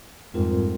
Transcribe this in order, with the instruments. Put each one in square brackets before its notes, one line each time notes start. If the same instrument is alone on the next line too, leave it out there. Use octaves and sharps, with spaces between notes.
[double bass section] F2 G#2 [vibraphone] G3 C4 F4 A#4